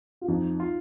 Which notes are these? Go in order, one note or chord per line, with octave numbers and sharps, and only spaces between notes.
F4
F2 D#4
F4